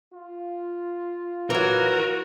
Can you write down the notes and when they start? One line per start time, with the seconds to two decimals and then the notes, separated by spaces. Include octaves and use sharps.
0.13 F4
1.50 E3 F#3 F#4 A#4